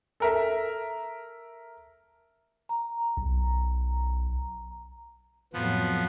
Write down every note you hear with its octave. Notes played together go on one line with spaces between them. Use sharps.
A4 A#4 E5
A#5
B1
F2 A2 F3 F#3 B3